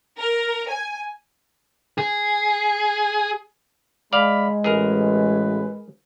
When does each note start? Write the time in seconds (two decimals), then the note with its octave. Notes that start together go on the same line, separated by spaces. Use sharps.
0.19 A#4
0.69 G#5
1.98 G#4
4.13 G#3 D5 F5 B5
4.64 A1 G#4 A#4 B4